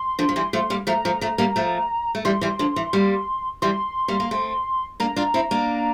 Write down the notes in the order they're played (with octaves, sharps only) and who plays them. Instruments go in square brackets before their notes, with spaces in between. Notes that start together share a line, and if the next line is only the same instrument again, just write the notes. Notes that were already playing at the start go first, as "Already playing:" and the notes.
Already playing: [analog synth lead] C6
[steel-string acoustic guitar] D3 F3
F3
E3 G3
F3 A3
G3 A#3
[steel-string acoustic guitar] F3 A3 [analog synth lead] A#5
[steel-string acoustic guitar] F3 A3
F3 A3
G3 A#3
F3 A3
A3
[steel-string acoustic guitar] E3 G3 [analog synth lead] C6
[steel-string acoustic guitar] E3 G3
D3 F3
E3
G3 A#3
[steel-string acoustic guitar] E3 G3 [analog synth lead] C6
[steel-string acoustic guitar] G3 A#3
A#3
A3 C4
[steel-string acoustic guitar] A#3 D4 [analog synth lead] A#5
[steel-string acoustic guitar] D4 F4
C4 E4
A#3 D4